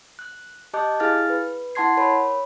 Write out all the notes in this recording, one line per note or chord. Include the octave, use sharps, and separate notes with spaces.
F#6
G4 D#5 A5 D6 F#6 G6
E4 G#4 F5 F6 A6
B4
E4 F#5 A5 C6 G#6 C7
A#4 C#5 B5